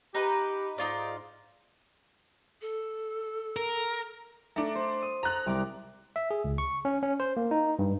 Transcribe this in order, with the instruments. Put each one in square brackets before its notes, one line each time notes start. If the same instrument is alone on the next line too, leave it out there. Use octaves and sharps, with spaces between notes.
[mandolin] D#4 B4 [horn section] G4
[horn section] G#2 [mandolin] D#4 F4 D5
[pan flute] A4
[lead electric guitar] A#4
[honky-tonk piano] A3 D4 [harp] A#5
[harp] C5
D#6
[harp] A4 [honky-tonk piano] A#5 F#6
[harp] C2 G3 D6
[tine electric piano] E5
G#4
C#2
C#6
C#4
C#4
C5
A#3
D#4
G2